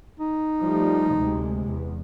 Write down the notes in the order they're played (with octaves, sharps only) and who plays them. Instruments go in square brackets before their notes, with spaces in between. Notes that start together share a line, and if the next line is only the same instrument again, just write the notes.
[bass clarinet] D#4
[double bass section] F3 G3 A3
D2 C3 G#3
E2